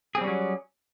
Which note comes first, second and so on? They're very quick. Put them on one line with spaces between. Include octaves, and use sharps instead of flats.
G#4 C4 G3 C#4 F#3